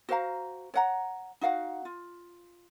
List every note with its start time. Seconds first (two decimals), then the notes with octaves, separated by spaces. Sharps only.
0.09 F#4 C5 F5 A#5
0.74 C#5 F#5 A#5
1.41 D#4 F#4 F5 F#5
1.85 F4